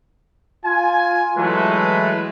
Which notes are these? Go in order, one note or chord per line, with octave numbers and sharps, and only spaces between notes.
F4 G#5
E3 F#3 G#3 A3 B4